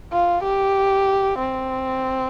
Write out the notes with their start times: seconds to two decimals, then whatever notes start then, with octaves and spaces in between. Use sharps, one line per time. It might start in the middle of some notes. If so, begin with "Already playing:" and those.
0.12 F4
0.44 G4
1.39 C4